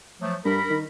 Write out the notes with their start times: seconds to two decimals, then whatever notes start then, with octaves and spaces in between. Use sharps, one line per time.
0.21 F3 F#3 A3
0.45 G2 A#4 B5
0.70 D#3